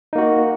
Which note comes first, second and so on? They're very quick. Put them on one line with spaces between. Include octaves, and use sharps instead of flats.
D#4 A#3 F#4